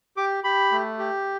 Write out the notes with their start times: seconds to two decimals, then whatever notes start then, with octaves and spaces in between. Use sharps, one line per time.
0.17 G4 D6
0.44 G4 B5
0.72 A3
0.99 G4